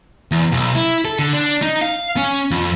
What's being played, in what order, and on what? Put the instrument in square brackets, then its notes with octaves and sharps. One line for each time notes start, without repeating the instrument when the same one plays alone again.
[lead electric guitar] E2
B1
E4
A4
D3
D4
D#4
F5
C#4
F2